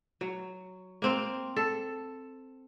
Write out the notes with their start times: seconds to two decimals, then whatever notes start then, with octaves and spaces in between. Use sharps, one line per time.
0.21 F#3
1.02 A#3 C4 C5
1.57 A4